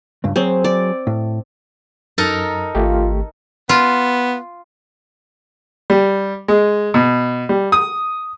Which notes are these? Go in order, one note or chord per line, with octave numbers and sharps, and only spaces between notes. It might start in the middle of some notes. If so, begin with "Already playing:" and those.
C#2 G2
F#3 C4 G#4 C#5
D5
A2
F#2 D#4 A4 A#4
G#1 A3 F4 G4
B3 F4
G3
G#3
B2
G3
D#6